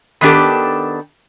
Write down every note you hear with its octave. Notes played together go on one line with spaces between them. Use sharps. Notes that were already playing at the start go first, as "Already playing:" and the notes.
D#3 B3 D4 G4 A4